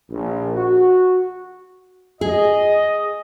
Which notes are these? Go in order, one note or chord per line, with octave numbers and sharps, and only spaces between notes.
A#1
F#4
G#4 D#5